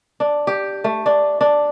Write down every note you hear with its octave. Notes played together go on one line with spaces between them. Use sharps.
D4
G4
A3
D4
D4